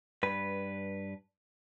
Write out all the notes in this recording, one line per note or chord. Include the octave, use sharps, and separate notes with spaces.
G2 B4